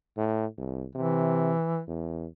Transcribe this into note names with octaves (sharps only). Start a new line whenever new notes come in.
A2
C2
C3 E3
E2